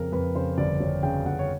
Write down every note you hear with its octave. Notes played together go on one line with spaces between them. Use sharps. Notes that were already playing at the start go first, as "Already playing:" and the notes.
Already playing: F2 C#3 A#4
F2 B4
C#3 C5
G1 D5
G1 C#5
C#3 G5
G1 F#5
C#5